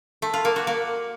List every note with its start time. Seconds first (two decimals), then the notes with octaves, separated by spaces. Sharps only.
0.22 A3
0.33 F4
0.45 A#3
0.56 F#4
0.67 A#3